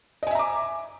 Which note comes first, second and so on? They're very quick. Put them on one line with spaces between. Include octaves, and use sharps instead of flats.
D#5 G#5 E5 A#5 D6